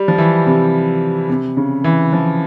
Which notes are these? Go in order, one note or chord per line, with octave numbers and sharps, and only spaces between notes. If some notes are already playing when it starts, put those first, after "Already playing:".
Already playing: G3
F3
E3
C3
C3
C#3
E3
F3